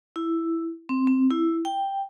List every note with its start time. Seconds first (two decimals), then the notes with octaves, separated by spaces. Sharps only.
0.16 E4
0.89 C4
1.07 C4
1.31 E4
1.65 G5